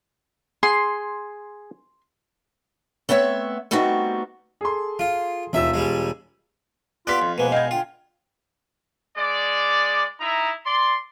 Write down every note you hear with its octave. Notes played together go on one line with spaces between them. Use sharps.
G#4 C6
A3 B3 C4 C#5 E5
G3 A3 B3 C4 D#4 F#4
G#4 A4 C6
F4
E1 D#2 F4 E5 E6
G3 G#3
B3 F4 G4 D5 F#6 B6
F2
B2 F3 G#3 A#3 B4
B3 D#5 F5 G5 G#5 G#6
D3 F4 G5
G#3 D5
D#4 E4 A#5
D5 C6